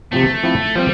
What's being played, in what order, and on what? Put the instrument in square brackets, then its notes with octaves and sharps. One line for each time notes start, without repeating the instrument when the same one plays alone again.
[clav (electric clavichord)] C3 F3 C4 [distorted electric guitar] A3
[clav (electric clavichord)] F3 C4 E4
[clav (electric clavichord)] F3 C4 [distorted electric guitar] G3